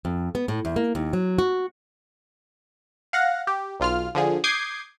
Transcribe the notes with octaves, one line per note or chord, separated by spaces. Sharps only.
F2
B3
A2
E2
A#3
D#2
F#3
F#4
F5 F#5 A#6
G4
B1 F4 F6
D3 F3 G#4
D6 D#6 G6 G#6 C7